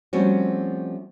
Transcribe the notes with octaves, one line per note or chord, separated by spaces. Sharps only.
F3 G3 A3 C4 C#4 F#4